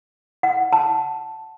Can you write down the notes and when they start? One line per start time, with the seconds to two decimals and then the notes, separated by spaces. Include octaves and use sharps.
0.43 F#5
0.73 A5